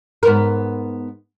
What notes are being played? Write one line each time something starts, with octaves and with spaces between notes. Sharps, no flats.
G#2 B3 A#4